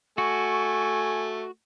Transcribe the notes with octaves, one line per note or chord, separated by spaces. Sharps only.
A3 F#4 G#5 C#6